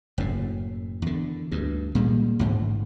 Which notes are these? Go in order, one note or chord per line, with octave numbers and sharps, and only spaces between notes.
F#1 F#2 A2
E2 D3
D2 G2
A#2 G3 G#3
A1 G#2 D3